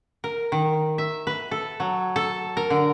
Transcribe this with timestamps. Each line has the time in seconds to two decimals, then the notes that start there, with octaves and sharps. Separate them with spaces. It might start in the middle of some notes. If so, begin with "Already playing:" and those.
0.24 A#4
0.52 D#3
0.98 E5
1.27 B4
1.51 A4
1.80 F#3
2.16 A4
2.57 A#4
2.70 D3